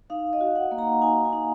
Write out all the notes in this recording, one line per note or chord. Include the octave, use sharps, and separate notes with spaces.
D#4 F5
D#5
F#4
F#5
A#3
A#5
D#4 G#5
G#5
D#4